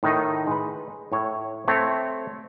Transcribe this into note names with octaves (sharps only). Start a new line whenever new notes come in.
A2 D#3 D#4
G#3 B4
A2 C#5
A3 C4 C#5